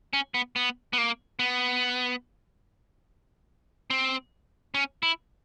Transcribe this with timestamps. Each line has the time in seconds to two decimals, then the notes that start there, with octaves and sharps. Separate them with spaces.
0.13 C#4
0.34 B3
0.56 B3
0.93 B3
0.98 A#3
1.39 B3
3.90 C4
4.74 C#4
5.03 E4